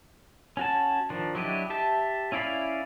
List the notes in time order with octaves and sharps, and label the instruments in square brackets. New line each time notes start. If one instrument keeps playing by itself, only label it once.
[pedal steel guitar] C#4 F#4 A5
D#3 F3 D4
F#3 D4 E4 G4 D#5
G4 E5 A5
C#4 E4 D5 F5 B5